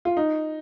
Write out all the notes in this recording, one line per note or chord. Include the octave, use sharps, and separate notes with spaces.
F4
D#4